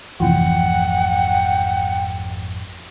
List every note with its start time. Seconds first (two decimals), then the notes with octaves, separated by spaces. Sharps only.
0.20 G#1 F2 C3 E3 F3 A3 F#5 G5